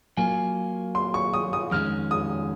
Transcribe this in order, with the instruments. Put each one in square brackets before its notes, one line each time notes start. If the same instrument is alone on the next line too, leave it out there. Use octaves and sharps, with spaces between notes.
[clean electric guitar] F#3 A#3 F4 [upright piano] G#5
[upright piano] C6
C#6
D#6
D#6
[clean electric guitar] F2 D#3 G#3 C#4 [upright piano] F6
[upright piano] D#6